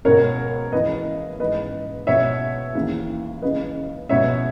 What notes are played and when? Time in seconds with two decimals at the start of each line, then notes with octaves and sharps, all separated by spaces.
0.05 C#2 B2 A#4 C#5
0.72 C#2 C#3 E3 B4 D#5
1.40 G#2 E3 B4 D#5
2.07 C#2 B2 C#5 E5
2.75 D#2 C#3 E3
3.42 C#2 C#3 E3 B4 D#5
4.09 C#2 B2 C#5 E5